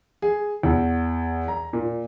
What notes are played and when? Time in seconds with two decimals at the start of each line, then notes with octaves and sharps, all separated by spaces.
0.22 G#4
0.63 E2
1.48 A#5
1.73 A#2